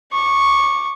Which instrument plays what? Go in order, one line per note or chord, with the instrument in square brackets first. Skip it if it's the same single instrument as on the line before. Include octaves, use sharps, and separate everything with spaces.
[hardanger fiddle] C#6 D6